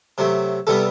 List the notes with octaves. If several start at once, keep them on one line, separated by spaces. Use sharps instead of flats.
C3 F#3 A3
C3 G3 B3 A4